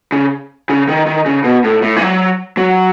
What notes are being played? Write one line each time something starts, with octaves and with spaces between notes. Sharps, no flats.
C#3
C#3
D#3
D#3
C#3
B2
A2
A2
E3
F#3
F#3